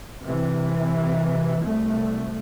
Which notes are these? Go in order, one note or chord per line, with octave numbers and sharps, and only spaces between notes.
C3 E3
C2 A3